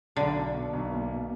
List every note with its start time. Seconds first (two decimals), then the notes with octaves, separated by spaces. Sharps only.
0.16 B1 D3
0.36 D4
0.54 B2
0.73 B1
0.92 A#3
1.11 B2